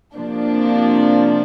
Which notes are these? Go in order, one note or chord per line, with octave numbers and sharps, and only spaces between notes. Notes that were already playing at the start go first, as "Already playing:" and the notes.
C3 F3 A#3 D4